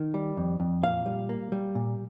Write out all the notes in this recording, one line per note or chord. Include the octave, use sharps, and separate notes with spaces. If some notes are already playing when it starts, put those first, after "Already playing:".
Already playing: D#3
G3
F2
F2
A#2 F5
G3
A#3
G3
A#2